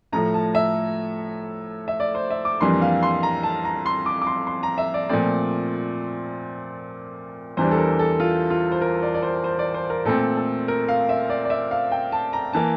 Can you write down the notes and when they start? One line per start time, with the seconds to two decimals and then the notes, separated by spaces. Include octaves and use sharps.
0.13 A2 F3 A3 A#5
0.34 A5
0.55 E5
1.88 E5
2.00 D5
2.15 C5
2.30 E5
2.45 D6
2.61 F2 E3 G3 A#3 D4 C6
2.82 F5
3.03 C6
3.23 A#5
3.43 A5
3.65 A#5
3.86 C6
4.06 D6
4.22 D6
4.27 C6
4.47 C6
4.63 A#5
4.78 E5
4.94 D5
5.09 A#2 F3 A3 C4 D5
7.57 E2 E3 G3 D4 C5
7.71 A4
7.78 A#4
7.99 A4
8.20 F4
8.50 F4
8.72 C5
8.81 A#4
9.02 D5
9.14 D5
9.23 C5
9.44 C5
9.59 D5
9.74 C5
9.90 A#4
10.05 A#2 A3 C4 A4
10.36 A4
10.68 A#4
10.89 F5
11.09 E5
11.30 D5
11.45 D5
11.50 E5
11.71 F5
11.92 G5
12.12 A5
12.33 A#5
12.53 E3 A#3 A5